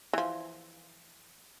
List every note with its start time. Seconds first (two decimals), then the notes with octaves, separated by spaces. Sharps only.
0.13 E3 F3